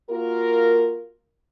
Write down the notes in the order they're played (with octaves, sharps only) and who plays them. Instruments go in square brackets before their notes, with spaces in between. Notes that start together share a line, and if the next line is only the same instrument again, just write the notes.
[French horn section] A#3 F4 F#4 A#4